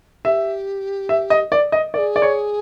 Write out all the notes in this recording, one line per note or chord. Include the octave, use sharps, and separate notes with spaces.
G4 E5
E5
D#5
D5
D#5
A#4 D5
G#4
D5
C#5